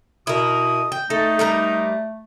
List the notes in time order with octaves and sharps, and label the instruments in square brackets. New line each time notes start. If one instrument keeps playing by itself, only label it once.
[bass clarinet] B2 [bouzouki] E4 A#4 [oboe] D#6
[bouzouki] G5
[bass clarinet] A3 [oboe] D#4 [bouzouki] A4
[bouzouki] G3 A#4 A#5